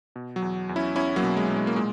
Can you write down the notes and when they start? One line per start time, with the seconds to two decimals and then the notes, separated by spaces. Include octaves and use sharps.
0.16 B2
0.36 F#3
0.42 E2
0.69 E2
0.76 C#4 E4
0.96 E2 C#4 E4
1.16 F#3 A#3
1.23 B2
1.37 G#3
1.50 B2
1.56 G#3
1.67 A#3
1.76 A#2 G#3